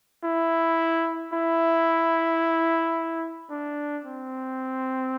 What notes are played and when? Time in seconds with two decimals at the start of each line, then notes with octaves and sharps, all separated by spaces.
0.24 E4
1.33 E4
3.50 D4
4.04 C4